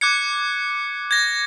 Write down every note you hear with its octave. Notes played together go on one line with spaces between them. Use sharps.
D6 F#6 G#6 C#7
G#6 A#6